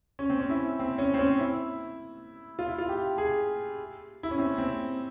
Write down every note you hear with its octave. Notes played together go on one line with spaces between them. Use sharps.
C#4
C4
C#4
E4
C4
C#4
C4
C#4
E4
F4
E4
F4
G4
G#4
E4
C#4
C4
C4